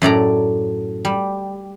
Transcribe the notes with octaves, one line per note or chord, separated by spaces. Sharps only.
F#2 A2 D5 A#5
G3